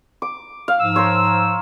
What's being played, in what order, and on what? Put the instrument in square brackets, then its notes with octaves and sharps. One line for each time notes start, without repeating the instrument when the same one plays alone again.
[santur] D6
F5
[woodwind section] G#2 F3 E6
[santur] A#4 C5 C#5